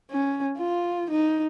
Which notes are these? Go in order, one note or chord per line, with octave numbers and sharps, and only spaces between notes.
C#4
F4
D#4